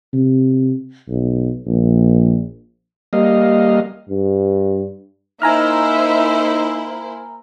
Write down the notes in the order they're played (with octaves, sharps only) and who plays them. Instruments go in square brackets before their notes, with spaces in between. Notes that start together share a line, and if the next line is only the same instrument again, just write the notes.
[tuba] C3
B1
A#1
[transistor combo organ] G3 A#3 D#5 F5
[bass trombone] G2
[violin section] A#3 E4 C5 [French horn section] D#4 [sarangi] E5 [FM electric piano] G#5 A#5 F6